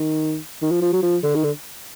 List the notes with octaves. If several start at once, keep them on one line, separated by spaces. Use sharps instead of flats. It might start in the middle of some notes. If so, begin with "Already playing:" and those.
Already playing: D#3
D#3
F3
F3
F#3
F3
D3
D#3
D3